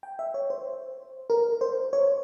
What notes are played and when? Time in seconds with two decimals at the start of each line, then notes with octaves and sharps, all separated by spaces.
0.03 G5
0.19 E5
0.34 C#5
0.50 C5
1.30 A#4
1.61 C5
1.93 C#5